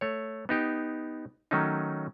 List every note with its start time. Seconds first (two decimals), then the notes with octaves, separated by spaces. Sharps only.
0.01 A3 C#5
0.49 B3 D#4 G4
1.51 D#3 F#3 A3 C#4 D#4